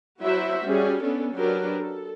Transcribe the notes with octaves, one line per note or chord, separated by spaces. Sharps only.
F#3 E4 F#4 C5 E5
G3 C#4 F#4 G#4
B3 C#4 D4 A4
F#3 D4 G4 A#4 B4
A4